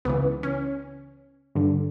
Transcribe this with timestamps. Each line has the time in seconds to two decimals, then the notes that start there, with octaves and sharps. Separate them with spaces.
0.05 C#2 C#3 E3 B3
0.43 C#4
1.55 G2 D3